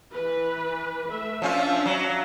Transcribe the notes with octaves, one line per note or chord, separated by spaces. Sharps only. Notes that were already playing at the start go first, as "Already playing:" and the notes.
E3 B4
A3 E5
F3 C#4 D4 F4 E5
F#3